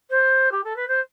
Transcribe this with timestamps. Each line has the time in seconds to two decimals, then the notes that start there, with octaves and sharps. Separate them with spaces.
0.10 C5
0.51 G4
0.64 A4
0.76 B4
0.88 C5